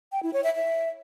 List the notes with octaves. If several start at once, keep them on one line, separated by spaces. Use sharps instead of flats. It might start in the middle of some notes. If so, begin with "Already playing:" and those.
G5
E4
C#5
E5
E5